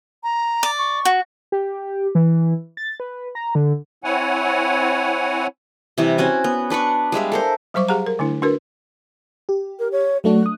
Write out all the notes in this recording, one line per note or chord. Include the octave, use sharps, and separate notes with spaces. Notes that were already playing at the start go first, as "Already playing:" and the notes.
A#5
D5
C#6
F#4
G4
E3
A6
B4
A#5
D3
C4 E4 C#5 F#5 G#5
C3 E3 G3
C4 C#4 F#4 G#5
B3
D4 B4 D5 C#6
G3 G#3 E5 F5
A4 A#4 C5
F#3 G3 C5 C#6 D6
G4 G#4 F5 F#5 A#5
A#4
D3 A3 D4 E4
D4 F#4 A#4 B4
G4
A#4
C#5
F#3 A3 D4 F#4
D#6 F#6